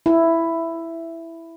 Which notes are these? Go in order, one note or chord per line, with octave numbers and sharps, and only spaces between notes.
E4